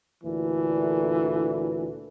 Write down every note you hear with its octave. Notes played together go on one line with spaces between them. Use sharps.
D2 A#2 D3 E3